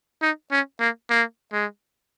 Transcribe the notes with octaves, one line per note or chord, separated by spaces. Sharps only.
D#4
C#4
A#3
A#3
G#3